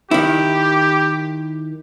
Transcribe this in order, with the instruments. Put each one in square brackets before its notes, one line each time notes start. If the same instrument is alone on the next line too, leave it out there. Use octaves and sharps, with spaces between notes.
[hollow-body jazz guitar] D#3 E4 [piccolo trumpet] G4